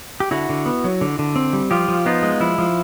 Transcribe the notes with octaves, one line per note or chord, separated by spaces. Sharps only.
G4
D3 E4 F#4
D3
B3
F#3
D3
D3
C4
G3
F3 F4 G4
F3
B3 D#4 F4
G#3
F3 E4
F3